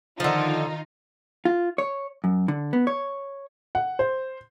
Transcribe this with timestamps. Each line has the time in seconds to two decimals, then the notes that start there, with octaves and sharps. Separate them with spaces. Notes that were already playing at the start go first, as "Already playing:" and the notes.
0.20 D3 D#3 F3 D#4 F4
1.45 F4
1.78 C#5
2.24 F#2
2.48 D3
2.73 B3
2.87 C#5
3.75 F#5
3.99 C5